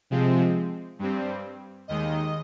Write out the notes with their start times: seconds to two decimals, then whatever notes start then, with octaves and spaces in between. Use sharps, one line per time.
0.10 C3 F3 G#3 C4
0.99 G2 G3 C4
1.88 D#2 D#3 G#3 D#5